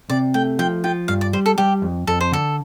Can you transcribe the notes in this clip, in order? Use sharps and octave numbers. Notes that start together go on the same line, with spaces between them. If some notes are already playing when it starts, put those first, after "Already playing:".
C3 D5
A3 G5
F3 G5
F4 G5
G2 F5
D5
G3 C5
A4
G3 G4
F2
F2 A4
C5
D3 A4